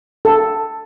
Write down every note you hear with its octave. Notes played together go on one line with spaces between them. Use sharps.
A4